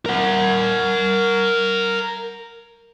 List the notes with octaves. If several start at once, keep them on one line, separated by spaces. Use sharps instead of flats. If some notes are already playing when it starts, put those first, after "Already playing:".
A#4 F#5